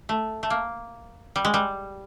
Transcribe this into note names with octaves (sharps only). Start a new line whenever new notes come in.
A3
A3
A#3
G3
G#3
G3